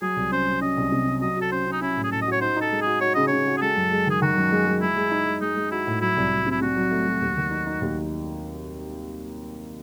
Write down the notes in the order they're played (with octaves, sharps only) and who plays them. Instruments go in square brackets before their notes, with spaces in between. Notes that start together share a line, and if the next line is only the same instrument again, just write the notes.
[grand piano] F#3 [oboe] G#4
[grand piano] C2
[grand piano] C#4 [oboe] C5
[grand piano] F#3
[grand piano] C#4 [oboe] D#5
[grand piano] C2
C3
C#4
[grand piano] F#3 [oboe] D#5
[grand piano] F#4 [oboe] A4
[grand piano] C#4 [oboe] C5
[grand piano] C#4
[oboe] D#4
[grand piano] C#4 [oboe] E4
[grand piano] A2
[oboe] G#4
[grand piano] A2 [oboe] A4
[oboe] D#5
[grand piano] F#4 [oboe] C#5
[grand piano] D#4 [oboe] C5
[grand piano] D#4 [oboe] A4
[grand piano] G#3
[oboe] G#4
[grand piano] F#4
[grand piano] F#4 [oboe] C#5
[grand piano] C#3 [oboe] D#5
[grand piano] C#3 [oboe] C#5
[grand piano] F#4
[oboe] G#4
[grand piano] G#3 [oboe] A4
[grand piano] F#2
G#3
[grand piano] D#3 [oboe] G#4
[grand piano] D#3 [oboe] F#4
[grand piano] F#2
G#3
G#3
[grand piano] G#3 [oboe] E4
[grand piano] G#3
D#4
G#3
[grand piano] G#3 [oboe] D#4
[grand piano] G#3
[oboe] E4 [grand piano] F#4
[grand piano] A2
[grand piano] F#3 [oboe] E4
[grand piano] C2
F#3
[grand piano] C3 [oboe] E4
[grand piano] C3 [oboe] F#4
[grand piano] F#3
A3
F#3
D#2
D#3
D#4
D#4
D#2